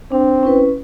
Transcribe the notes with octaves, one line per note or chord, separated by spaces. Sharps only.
C4 D4
C#4 E4 B4